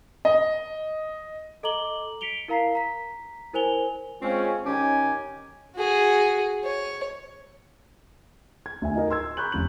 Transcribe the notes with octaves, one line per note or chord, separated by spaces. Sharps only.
D#5
A4 D#5 A#5 D6 F#7 G7
B6 C#7 D7 F7 G7
E4 A#4 F5 A#5 B6 C7
A#5 B6
E4 A#4 C5 G#5 F7 G7
G#3 C4 C#4 F4
D#3 C#4 G4 G#5
F#4 G#4
C#5
G#6
D2 E5 G#5
D#4 F#4 A#4 D#5
C6 E6 G#6
A#5 B5 C#6 F#6 G6 F#7
F1 C#4 F#7